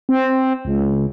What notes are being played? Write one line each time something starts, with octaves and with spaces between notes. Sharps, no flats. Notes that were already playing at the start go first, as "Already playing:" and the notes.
C4
C#2